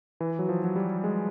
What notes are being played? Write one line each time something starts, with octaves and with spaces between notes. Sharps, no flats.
E3
F#3
F3
F#3
G3
G#3